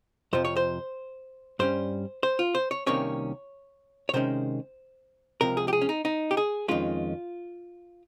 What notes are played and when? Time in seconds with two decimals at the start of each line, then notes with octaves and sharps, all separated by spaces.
0.33 F2 C3 F3 C5
0.45 C#5
0.57 C5
1.59 G2 G3 C#4 C5
2.23 C5
2.39 F4
2.55 C5
2.71 C#5
2.86 C2 C3 D#3 A#3 C#4 C#5
4.09 C#5
4.13 C3 D#3 G#3 C#4 C5
5.41 C#2 C3 F3 A#4
5.57 G#4
5.68 G4
5.73 G#4
5.81 C#4
5.89 D#4
6.05 D#4
6.31 G4
6.37 G#4
6.68 F2 D#3 G#3 C#4 F4